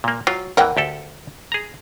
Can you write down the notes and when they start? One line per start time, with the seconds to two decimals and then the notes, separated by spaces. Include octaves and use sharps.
0.04 A#2 A#3
0.27 F#3 F4
0.57 E2 E3 A#4 F#5 G5
0.77 D2 G4 A4
1.52 G#4 A#5